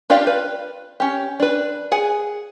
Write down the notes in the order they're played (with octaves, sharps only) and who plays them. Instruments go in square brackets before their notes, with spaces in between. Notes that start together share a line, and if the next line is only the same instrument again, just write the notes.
[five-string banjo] D4 F4 G4 D5 F5
B4
C#4 G4
D4 B4
G#4 F#5 G#5